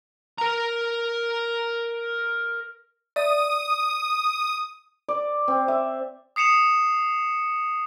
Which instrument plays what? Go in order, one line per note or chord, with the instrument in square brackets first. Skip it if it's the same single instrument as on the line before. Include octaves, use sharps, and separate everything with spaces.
[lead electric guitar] A#4 A#5
[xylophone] D5 E5 [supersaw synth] D#6
[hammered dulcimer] D5
C4
E5
[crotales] D#6 C7 C#7 E7 F7